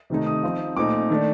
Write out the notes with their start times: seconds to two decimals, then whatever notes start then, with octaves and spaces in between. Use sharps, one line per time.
0.10 C3 D#3 A3 D#4
0.26 D#6
0.43 F3 C4 D#4
0.76 A#2 A3 C4 D#4 D6
1.10 D#3 A3 D4